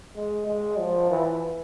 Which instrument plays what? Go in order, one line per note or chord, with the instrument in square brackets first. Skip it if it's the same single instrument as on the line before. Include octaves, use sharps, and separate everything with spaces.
[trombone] G#3
G#3
F3
E3